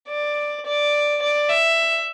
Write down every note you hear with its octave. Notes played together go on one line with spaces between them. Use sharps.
D5
D5
D5
E5